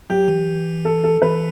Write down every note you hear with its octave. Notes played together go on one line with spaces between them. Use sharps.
F#3 G4
E3
A4
A4
E3 B4